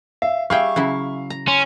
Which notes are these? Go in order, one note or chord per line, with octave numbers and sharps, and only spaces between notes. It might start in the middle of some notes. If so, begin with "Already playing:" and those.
E5 F5
G3 G#4 E5 F5 G5 C#6
C#3 F#3 E4
A#5
C#4 C6